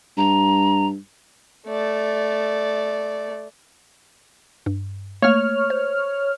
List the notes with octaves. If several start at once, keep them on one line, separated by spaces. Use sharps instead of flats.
G2 A#5
A3 D5
G2
A3 A#3 C#5 F6
C5